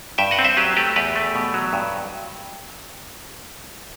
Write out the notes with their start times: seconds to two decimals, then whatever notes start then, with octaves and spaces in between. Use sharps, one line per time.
0.18 G2 E5 G5
0.31 D#5 F#5
0.39 C4
0.44 C5 E5
0.57 F#3 G4 B4
0.77 A3 G4 B4
0.96 E2 G4 B4
1.16 A3
1.35 B2
1.54 F#3
1.73 G2